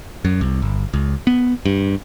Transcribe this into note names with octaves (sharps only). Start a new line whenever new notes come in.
F#2
C2
G1
C#2
B3
G2